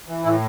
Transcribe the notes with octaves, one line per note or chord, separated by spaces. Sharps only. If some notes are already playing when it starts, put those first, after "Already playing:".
E3
A2 E4